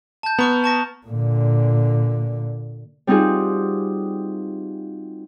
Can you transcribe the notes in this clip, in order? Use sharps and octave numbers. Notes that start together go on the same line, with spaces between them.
A5 G6
B3 A#5 C#6 F6
A5 C#6 A#6
A#2 D3
G3 C4 D#4 F4 F#4 G#4